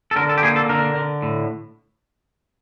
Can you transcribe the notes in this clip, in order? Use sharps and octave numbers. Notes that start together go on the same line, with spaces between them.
A4
D3 A#4
A4
G4
A#3 G#4
A4
D3 A#4
D3
A2